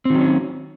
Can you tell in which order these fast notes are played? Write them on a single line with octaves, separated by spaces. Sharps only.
C4 D#3 F#3 C#4